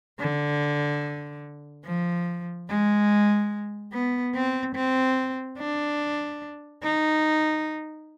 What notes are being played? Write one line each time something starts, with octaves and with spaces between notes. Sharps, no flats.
D3
F3
G#3
B3
C4
C4
D4
D#4